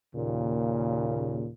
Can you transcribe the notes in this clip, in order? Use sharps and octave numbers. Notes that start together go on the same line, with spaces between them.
D#2 A#2 C#3